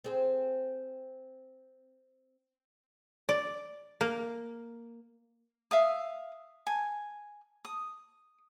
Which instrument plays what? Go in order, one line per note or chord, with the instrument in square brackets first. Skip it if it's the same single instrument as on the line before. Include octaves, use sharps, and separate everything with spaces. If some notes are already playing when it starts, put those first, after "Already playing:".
[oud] C4 G#4 C5
[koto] D5
A#3
[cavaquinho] E5 F5 D#6
G#5
D#6